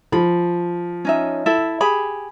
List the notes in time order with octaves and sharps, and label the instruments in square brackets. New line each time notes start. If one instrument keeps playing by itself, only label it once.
[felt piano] F3 [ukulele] B5
[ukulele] C#4 D#4 E5
E4 A4 E5
G4 G#4 B5